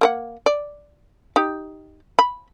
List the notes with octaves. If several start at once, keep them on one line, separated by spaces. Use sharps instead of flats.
A#3 A#4 F#5
D5
D#4 G4
B5